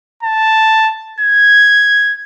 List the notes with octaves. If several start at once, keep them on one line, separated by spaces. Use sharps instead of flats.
A5
G#6